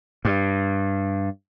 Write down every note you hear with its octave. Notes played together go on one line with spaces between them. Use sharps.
G2